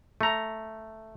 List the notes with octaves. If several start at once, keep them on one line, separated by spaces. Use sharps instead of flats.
A3 A#5